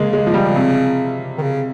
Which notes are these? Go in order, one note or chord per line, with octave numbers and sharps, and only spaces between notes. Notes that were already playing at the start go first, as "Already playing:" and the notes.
Already playing: C#3 G#3 A#3
G#3
F3
G3
C3
D#3
C#3